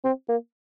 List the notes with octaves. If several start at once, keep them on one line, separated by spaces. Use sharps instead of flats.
C4
A#3